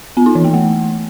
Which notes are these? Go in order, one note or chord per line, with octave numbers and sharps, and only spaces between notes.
B3
D#4
E3
A#3
A3